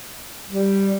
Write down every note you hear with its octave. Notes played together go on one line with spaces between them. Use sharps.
G3